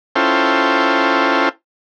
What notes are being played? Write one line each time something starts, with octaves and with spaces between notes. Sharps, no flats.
C#4 E4 F4 A4 C5 G5